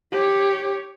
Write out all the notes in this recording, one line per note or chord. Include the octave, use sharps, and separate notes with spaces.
G4 C#5